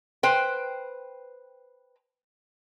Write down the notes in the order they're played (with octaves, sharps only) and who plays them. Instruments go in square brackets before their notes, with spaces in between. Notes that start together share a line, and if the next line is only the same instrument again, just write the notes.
[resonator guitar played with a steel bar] B4 C5 G5